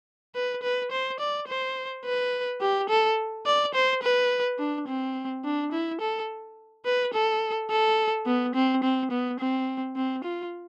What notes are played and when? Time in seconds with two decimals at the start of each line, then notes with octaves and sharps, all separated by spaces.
0.35 B4
0.63 B4
0.91 C5
1.20 D5
1.48 C5
2.05 B4
2.61 G4
2.89 A4
3.46 D5
3.74 C5
4.02 B4
4.59 D4
4.87 C4
5.44 D4
5.72 E4
6.01 A4
6.85 B4
7.13 A4
7.70 A4
8.26 B3
8.55 C4
8.83 C4
9.11 B3
9.40 C4
9.96 C4
10.24 F4